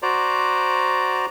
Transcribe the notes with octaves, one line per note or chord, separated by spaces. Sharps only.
F#4 C5 D5 A#5